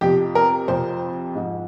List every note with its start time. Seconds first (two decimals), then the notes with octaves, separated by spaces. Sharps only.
0.01 F2 C3 F3 G4
0.35 A#4
0.68 F2 C3 F3 C5
1.35 G#2 F3